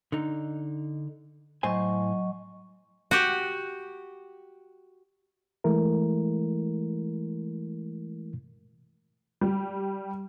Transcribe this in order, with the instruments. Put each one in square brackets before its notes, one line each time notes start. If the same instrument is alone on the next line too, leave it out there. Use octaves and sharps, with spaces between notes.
[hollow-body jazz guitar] D3 D#4
[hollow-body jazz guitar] A2 C5 G#5 [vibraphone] F#3 D#5 C#6
[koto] F#4 G4
[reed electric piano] E3 G#3 A3 E4 A#4
[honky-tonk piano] G3